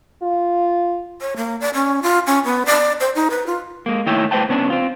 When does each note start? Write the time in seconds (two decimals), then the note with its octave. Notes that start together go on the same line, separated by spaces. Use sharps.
0.22 F4
1.21 C#5
1.37 A#3
1.61 D5
1.75 C#4
2.03 F4
2.27 C#4
2.45 B3
2.66 D5
3.00 C5
3.15 D#4
3.30 B4
3.46 F4
3.86 G#3 A#3
4.06 D#3 A3 E4 C#5 E5 G5
4.31 A3 B4 C5 D5 G5 A5
4.49 C#3 B3 C#4 D4
4.70 C4 F4